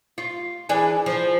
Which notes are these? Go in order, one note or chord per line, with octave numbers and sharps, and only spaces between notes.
F4
E3 D4 G#4
F3